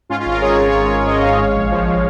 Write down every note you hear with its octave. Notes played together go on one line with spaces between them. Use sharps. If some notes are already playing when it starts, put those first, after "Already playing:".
G#2 C#4 F4
C#4 F4
G#1
F4 A#4
G#3 G#4 C#5
G#1
G#1
G#1
G#2 A#4 D#5
G#1 C#5 F5
G#3
A#1
F3
G#3